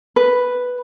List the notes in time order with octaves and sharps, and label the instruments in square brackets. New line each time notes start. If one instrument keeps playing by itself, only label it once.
[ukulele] B4